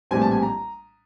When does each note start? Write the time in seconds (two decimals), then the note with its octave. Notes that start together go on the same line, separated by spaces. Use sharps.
0.11 A#1 A2 E3 G3 C4 G#5
0.22 A5
0.31 G#5
0.43 A#5